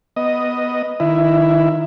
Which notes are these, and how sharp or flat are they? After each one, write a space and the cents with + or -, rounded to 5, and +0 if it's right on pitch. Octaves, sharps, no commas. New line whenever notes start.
B3 +0 D#5 +0
D#3 -10 E4 +15